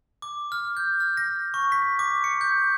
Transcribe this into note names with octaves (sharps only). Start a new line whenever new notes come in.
D6
F6
G6
F6
A#6
C#6
B6
D6
C#7
G6